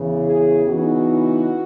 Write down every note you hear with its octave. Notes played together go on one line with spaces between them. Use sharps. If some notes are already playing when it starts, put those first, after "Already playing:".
Already playing: E2 C#3 E3
G#4
C#3 E3 B3 D#4 F#4